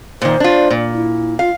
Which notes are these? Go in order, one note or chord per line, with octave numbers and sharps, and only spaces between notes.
A#2 D#3 C5
D4 F4
A#2
E4
F4 F5